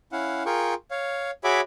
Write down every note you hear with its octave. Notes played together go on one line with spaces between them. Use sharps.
C#4 E4 F5 F#5
F4 G#4 A#4 G5 C#6
C#5 F5
F#4 G#4 C#5 E5 B5 D6